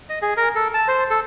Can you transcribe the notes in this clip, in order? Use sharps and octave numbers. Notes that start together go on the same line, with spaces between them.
D#5
G#4
A#4
A4
A5
C5
A4